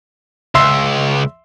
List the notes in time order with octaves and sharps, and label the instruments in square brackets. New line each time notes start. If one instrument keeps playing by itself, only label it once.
[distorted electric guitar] C#2 [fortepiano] E5 C6 E6